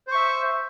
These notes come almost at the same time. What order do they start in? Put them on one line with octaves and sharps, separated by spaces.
C5 C#6 E5